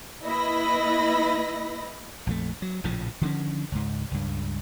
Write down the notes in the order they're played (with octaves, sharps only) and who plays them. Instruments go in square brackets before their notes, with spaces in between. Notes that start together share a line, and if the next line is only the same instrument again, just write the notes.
[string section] A#3 E4 B4 D#5 B5 A#6
[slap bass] A#1 F2 A3
F#3
A#1 A2 C#3 F3
D3 D#3 F3 C#4
C#2 G#2
C#2 G2